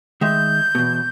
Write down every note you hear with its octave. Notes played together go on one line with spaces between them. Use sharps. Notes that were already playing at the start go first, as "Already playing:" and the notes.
D#3 G#3 E5 G6
E2 B2